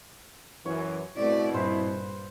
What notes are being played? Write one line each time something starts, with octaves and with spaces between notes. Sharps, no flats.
F#2 E3 C#5
B2 A3 C4 E4 D5
G2 A#2 B4 C5